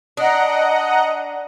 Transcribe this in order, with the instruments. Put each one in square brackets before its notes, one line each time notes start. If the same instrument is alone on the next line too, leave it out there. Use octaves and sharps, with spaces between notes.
[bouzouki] D4 [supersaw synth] D#5 F#5 A#5